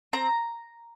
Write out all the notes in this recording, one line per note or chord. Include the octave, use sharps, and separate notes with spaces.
C4 A#5